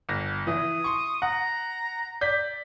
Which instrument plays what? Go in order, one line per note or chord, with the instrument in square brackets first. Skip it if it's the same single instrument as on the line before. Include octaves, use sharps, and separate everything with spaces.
[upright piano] G1 A#6
[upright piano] E3 E4 [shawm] D#6
[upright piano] C6 C#6
[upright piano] F#5 [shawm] A#5
[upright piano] D5 G6 B6